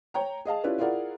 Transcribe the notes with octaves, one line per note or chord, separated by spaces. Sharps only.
C#5 G5 A#5
G#4 D#5 F5 A5
C#4 E4 F4 G4 B4 D5
E4 F4 G#4 A#4 D5 F#5